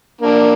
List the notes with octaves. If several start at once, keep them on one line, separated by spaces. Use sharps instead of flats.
A#3 D4